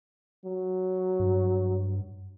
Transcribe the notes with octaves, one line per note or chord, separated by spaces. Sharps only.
F#3
G2